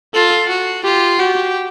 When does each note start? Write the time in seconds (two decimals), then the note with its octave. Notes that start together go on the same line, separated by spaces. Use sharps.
0.14 F4 A4
0.49 F#4
0.84 F4 G4
1.18 F#4 G4